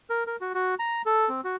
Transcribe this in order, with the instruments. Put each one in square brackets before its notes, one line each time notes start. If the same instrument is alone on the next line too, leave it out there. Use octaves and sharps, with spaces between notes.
[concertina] A#4
A#4
F#4
F#4
A#5
A4
C4
F#4